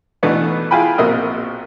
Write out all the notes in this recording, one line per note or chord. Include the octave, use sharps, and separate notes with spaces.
B2 E3 A3 B3 D4 D#4
E4 F4 G#4 G5 G#5 B5
A#1 B2 C4 A#4 D#5 E5